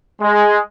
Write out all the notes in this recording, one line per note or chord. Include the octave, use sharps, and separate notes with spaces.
G#3